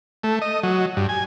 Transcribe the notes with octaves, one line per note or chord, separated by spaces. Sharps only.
A3
D#5
F#3
G2
G#5